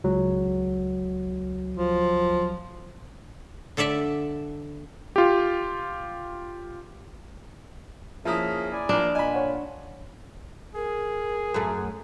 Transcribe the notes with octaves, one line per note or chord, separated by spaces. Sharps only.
C#2 F#3
F3
D3 A4 D5 E5 A5
F4 G4
F3 A#3 C#4 E4 G#4 E5 D#6
E4 D5 G#5
F3 A#3 D4
A#2 F4 D#5 G#5 B5
C#5 F#5
G#4 A#4
F#2 A3